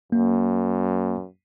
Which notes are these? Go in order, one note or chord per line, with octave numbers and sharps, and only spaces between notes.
F#2 A#3